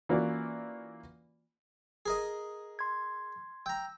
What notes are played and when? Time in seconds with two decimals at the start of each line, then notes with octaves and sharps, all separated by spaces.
0.09 E3 A#3 C#4 F4 F#4 D5
2.06 G#4 A#4 D#5
2.79 C6 G#6
3.66 G5 A#5 E6